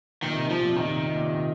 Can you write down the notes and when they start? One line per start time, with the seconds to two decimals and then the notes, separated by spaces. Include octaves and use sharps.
0.22 A#2 D#3
0.32 C3
0.41 A#2
0.50 C3 F3
0.59 A#2
0.70 C3
0.76 A#2 D#3
0.88 C3
0.97 A#2
1.06 C3
1.16 A#2
1.24 C3
1.34 A#2